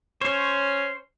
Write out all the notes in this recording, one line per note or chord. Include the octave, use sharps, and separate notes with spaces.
C#4 C5 C#5